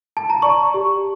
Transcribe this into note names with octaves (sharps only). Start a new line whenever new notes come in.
A5
A#5
D5 C#6
G4